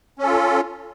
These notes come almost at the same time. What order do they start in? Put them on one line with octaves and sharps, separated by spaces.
C#4 A4 F4